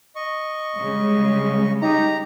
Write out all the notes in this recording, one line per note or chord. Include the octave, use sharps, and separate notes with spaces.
D#5 C#6
C#3 G3 G#3
D#4 G4 A#5